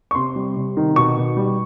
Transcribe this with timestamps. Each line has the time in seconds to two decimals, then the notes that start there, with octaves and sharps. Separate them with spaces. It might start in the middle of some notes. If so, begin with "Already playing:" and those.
0.11 C#6
0.15 C3 C6
0.36 G3
0.56 C3
0.77 D#3
0.96 B2 C#6
1.17 B2
1.37 G3